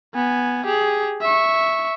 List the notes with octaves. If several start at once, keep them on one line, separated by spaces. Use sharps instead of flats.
B3 G#5
G4 G#4
E5 C#6